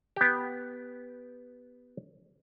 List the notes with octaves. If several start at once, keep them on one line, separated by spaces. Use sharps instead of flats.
B3 G4